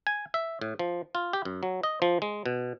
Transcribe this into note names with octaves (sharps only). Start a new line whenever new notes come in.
G#5
E5
A2
F3
F4
G4
F#2
F#3
D#5
F3
G#3
B2